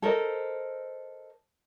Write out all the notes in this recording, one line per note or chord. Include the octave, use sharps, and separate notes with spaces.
A4 A#4 C5 D#5